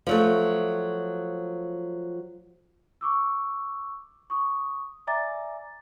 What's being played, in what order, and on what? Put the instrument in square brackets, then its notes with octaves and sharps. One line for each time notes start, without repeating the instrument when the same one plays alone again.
[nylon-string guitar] F3 F#3 A3
[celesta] C#6 D6 E6
C#6 D#6
D5 E5 G#5 A#5 D6 A6